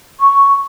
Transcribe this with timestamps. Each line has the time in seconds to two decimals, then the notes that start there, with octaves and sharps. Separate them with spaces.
0.20 C#6